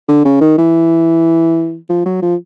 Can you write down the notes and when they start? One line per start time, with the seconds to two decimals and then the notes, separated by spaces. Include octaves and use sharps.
0.08 D3
0.25 C#3
0.41 D#3
0.58 E3
1.90 F3
2.06 F#3
2.22 F3